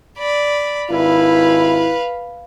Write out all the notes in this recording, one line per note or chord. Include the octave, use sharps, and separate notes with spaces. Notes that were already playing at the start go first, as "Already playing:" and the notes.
D5 B5
G#1 E4 B4 F5